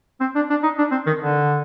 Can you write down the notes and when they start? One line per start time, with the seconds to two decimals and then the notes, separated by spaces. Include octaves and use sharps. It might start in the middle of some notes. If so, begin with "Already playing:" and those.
0.20 C4
0.35 D4
0.50 D4
0.63 D#4
0.78 D4
0.91 C4
1.06 D#3
1.21 D3